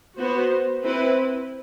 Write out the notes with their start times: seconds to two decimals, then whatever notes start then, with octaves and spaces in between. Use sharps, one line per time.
0.19 B3 F#4 C5
0.85 C4 E4 B4